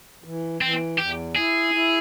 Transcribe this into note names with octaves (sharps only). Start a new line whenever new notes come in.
E3
E3 C4
E2 G4
E4 G#4
E4